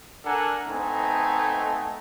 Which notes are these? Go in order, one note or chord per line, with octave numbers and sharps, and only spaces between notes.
D4 A4 A#4 F#5 G#5 A#5
A3 B3 C4 D#4 A4 G#5